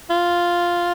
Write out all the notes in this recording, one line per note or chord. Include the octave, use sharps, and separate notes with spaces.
F4